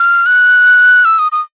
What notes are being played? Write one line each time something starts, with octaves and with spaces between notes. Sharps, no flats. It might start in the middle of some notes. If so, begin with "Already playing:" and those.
Already playing: F6
F#6
E6
D#6
D#6